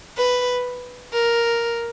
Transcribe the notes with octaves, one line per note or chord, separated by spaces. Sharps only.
B4
A#4